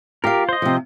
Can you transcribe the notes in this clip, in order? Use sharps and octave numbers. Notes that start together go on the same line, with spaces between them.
F4 G4 A#4 F5
C5 D#5
C3 F3